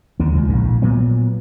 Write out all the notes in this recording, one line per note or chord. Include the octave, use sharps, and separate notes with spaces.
D#2 D3
C#2
A#1 A2
A#2 F#3 B3